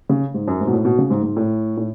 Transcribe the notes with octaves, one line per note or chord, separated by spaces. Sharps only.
C#3
G#2
F#2
G#2
B2
A2
B2
C#3
G#2
G#2
A2
A2